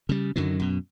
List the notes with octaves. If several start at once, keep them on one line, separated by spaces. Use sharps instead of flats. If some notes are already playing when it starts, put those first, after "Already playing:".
C#3 G3
F#2 D3 D#3 F#3
F#2 B2